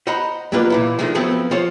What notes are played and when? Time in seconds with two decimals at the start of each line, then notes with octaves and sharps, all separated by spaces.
0.07 C5 D#5 F#5 A#5 B5
0.52 F2 D3 F#3 A#3 F4 B4
0.70 A#2 E3 E4
0.99 D#3 F3 G#3 A3 D4
1.15 F3 F#3 A3 B3 C4 F#4
1.51 F3 F4 C5 C#5